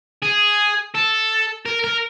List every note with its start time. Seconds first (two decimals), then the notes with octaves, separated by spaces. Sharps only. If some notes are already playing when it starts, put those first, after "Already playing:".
0.23 G#4
0.94 A4
1.65 A#4
1.84 A#4